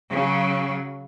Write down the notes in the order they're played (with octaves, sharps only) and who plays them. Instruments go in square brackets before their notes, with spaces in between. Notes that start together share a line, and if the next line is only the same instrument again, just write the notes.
[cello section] C#3 F#3